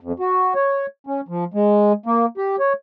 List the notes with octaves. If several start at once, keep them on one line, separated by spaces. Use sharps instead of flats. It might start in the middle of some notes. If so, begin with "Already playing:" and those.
F2
F#4
C#5
C#4
F3
G#3
A#3
G4
C#5